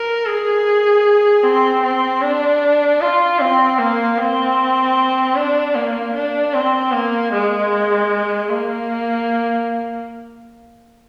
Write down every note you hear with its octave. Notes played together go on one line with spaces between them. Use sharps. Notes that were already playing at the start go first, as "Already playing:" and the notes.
Already playing: A#4
G#4
C4
C4
D4
F4
C4
A#3
C4
D4
A#3
D4
C4
A#3
G#3
A#3